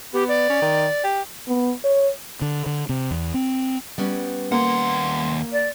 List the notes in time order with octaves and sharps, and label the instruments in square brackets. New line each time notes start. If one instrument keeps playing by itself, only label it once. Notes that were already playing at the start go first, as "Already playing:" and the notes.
[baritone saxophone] B3 [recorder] G4
[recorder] D5
[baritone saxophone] C#4
D#3
G4
[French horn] B3
C#5
[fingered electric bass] D3
D3
C3
E2
C4
[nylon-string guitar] G3 B3 C#4
[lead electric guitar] D#2 F#5 [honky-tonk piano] A#3 [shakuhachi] C6
[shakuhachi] D5